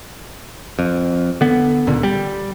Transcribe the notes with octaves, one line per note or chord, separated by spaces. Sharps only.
F2
D3 B3
C#2 A#2 D3
G3